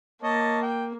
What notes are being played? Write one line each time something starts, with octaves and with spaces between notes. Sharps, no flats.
A#3 C#5 D#5 A5
G5